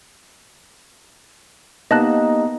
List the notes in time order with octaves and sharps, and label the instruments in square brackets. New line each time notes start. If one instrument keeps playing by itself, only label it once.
[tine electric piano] A#3 B3 G4 [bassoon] D#4 [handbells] D#5 A5 F#6